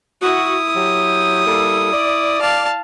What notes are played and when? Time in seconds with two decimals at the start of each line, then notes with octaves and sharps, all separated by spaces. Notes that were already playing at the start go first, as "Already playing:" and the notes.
0.22 E4 F#4 D#6
0.75 F#3 G4
1.46 G3 A#3 A4
1.93 D5
2.41 F5 A5